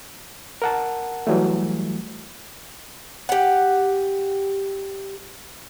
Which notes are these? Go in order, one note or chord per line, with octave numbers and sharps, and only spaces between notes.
A#4 F#5 A5
E3 F#3 G3 A3
G4 F#5